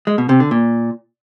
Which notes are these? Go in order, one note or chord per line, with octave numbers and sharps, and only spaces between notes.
G#3
B2
C3
D3
A#2